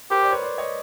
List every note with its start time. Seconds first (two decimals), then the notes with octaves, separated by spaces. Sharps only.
0.11 G4 A#4 C5
0.22 C5 D5
0.32 B4 C#5
0.42 C5 D5
0.58 C#5 D#5